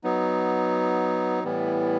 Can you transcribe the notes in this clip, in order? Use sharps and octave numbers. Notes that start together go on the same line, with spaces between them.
F#3 B3 D#4
A2 E3 G3 B3